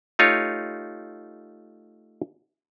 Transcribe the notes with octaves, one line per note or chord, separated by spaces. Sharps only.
A3 D#4 F4 G4 C#5